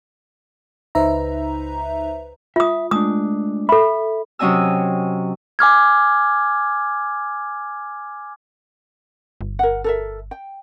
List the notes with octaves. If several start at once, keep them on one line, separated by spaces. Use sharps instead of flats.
C#2 D#4 B4 C5 E5 A#5
F4 E5 D#6
G#3 A3 D4 D#6
A4 E5 B5
C3 F#3 C#4 D#5 G#5 E6
G#5 D6 F6 G#6
G1
A#4 F#5
A4 A#4 E5
G5